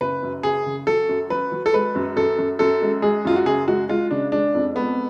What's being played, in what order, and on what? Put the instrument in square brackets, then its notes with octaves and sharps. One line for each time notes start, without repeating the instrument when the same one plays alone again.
[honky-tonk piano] F#1 [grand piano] B4
[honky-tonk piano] F#2
[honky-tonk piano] F#1 [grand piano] G#4
[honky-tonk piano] C#3
[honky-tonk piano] F#3 [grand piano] A4
[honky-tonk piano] F#2
[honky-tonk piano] F#3 [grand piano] B4
[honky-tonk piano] F#3
[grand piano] A4
[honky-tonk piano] G#3 [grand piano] B4
[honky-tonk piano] F#2
[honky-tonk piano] F#2 [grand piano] A4
[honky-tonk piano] F#2
[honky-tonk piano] F#2 [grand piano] A4
[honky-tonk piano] G#3
[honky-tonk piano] G#3 [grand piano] G#4
[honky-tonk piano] F#2 [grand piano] F4
[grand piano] F#4
[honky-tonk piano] F#1 [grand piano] G#4
[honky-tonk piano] G#3 [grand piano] F#4
[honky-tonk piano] G#3 [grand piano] F4
[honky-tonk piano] C#3 [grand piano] D4
[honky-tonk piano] G#3 [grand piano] D4
[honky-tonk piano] F2
[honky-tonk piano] G#3 [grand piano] B3